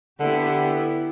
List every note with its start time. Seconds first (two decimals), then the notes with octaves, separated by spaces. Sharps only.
0.20 D3 B3 E4 G4